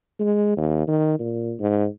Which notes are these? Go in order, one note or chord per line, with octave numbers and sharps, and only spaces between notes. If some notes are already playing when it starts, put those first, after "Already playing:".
G#3
D#2
D#3
A#2
G#2